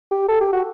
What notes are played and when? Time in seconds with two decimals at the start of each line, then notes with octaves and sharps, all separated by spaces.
0.11 G4
0.28 A4
0.41 G4
0.52 F#4